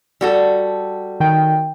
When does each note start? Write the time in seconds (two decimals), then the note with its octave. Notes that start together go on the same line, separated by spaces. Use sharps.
0.21 G3 F#4 A4
1.20 D#3 G5